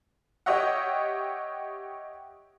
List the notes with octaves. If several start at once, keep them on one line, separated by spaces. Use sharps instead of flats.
G4 C#5 D#5 E5 F#5